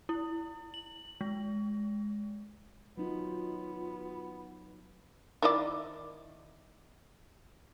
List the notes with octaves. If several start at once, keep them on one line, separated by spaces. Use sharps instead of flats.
E4
F#7
G#3
F#3 B3 D#4 F4
D#3 E4 D5